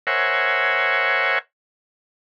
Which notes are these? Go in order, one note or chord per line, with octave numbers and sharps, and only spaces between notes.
A#4 C5 C#5 E5 F#5 G#5